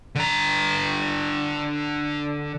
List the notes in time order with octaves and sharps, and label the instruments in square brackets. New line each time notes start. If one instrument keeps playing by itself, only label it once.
[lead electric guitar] D3 A#5